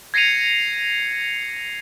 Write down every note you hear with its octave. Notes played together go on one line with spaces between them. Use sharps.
G#6 A#6 C7 C#7 D#7 F7